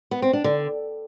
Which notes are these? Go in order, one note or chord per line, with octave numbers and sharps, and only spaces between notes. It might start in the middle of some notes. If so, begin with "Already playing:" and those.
B3
C4
D4
D3